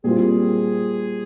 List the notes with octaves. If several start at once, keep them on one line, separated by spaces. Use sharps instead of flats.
A#2 G3 C4 F4 G#4